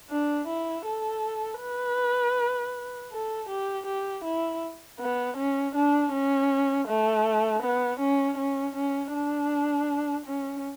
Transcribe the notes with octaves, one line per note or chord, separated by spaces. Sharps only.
D4
E4
A4
B4
A4
G4
G4
E4
B3
C#4
D4
C#4
A3
B3
C#4
C#4
C#4
D4
C#4